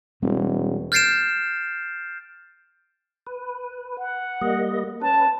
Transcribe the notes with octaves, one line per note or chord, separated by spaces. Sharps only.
E1 G3 C4
F6 G6 A6 C7 D7 E7
B4
F#5
G3 A#3 D#5
C#4 B4 A5